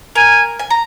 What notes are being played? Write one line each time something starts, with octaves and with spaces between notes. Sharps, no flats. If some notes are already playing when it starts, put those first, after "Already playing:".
A#4 G#5
G#5
A#5